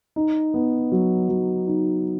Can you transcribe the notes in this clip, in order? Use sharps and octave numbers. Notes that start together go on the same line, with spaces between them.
D#4
B3
F#3
F#3
D#4